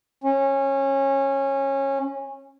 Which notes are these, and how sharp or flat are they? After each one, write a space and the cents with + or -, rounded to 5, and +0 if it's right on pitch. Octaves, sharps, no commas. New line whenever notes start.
C#4 -20